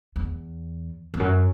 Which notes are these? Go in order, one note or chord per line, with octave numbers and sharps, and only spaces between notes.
E2
E2
F#2